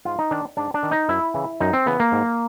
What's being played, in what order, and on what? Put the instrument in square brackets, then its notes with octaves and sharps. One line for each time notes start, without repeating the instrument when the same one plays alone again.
[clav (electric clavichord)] G#2 F4
D#4
D#3 D4
G#2 D4
D4
D#3
D#4
F#2 E4
C#3 E3
F#2 D#4
C4
C#3 E3 B3
A#3
G#2